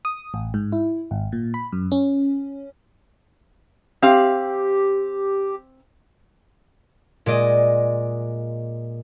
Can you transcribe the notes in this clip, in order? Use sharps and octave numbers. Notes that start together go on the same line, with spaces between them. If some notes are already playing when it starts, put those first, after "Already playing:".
D#6
A1
G#2
E4
G#1
A#2
B5
F#2
C#4
C4 G4 F5
A#2 G#3 D5 D#5